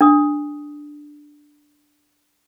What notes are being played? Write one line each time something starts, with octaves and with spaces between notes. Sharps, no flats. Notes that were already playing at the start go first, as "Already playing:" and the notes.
D4 D#6